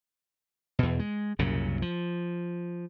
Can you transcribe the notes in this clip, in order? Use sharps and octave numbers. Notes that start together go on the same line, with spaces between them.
E2 B2
G#3
C2 F#2 A#2 C#3
F3